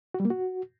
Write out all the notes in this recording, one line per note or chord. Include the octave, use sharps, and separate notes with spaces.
F#4
G3
A#3
F#4